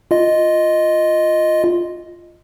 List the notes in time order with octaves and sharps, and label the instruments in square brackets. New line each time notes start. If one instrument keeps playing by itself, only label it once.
[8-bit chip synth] F4 D#5